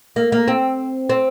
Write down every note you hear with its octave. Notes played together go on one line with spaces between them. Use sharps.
A#3
A#3
C4
C4